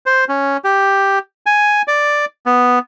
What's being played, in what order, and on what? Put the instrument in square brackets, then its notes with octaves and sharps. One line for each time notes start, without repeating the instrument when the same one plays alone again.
[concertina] C5
C#4
G4
G#5
D5
B3